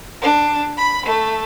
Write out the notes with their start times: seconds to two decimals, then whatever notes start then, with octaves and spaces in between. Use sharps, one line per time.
0.20 D4
0.76 B5
1.05 A3